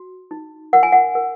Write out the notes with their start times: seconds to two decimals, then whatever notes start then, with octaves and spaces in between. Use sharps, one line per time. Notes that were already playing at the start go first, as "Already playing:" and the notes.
Already playing: F#4
0.31 D#4
0.73 A#4 F#5
0.83 G#5
0.92 F#5
1.15 A#4